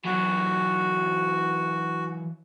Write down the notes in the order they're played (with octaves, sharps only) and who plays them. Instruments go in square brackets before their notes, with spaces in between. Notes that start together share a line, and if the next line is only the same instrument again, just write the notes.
[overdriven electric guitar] E3 F#3 [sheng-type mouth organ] F#4